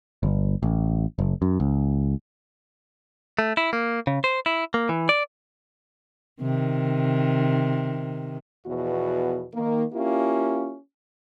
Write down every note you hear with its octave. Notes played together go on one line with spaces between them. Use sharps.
G1
A1
F#1
F#2
C#2
A3
E4
A#3
C#3
C5
E4
A#3
E3
D5
C3 D#3
E2 B2 F3 B3 F#4
D#3 A#3
A#3 C#4 E4 F4 G4